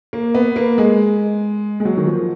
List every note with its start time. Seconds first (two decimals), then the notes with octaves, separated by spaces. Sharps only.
0.13 A#3
0.34 B3
0.56 A#3
0.78 G#3
1.80 G#3
1.85 F#3
1.97 D#3
2.07 F3